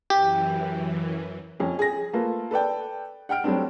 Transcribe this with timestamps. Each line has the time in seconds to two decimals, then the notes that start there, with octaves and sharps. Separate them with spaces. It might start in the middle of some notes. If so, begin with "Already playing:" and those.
0.10 F#2 E3 G4
1.60 F2 C#4
1.79 G#4 A#6
2.13 A3 A#3 F4 A4 B4
2.51 A4 B4 D5 G5
3.29 F#5 G5 F6 D7
3.44 F#3 G3 A3 C4 D4